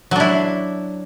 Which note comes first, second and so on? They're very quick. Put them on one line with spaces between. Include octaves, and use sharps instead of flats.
F#3 D4 E4